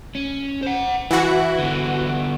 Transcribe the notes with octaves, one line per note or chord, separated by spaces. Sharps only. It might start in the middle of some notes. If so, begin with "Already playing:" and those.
C#4
C5 F#5
E3 E4 F#4
D3 B3